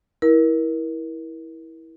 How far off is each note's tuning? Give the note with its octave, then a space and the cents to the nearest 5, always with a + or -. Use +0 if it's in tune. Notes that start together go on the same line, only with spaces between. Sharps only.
E4 -15 A#4 +25